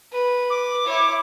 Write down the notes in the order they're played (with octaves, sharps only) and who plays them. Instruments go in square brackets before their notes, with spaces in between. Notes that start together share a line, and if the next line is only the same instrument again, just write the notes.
[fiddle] B4
[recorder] D6
[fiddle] E4 C#5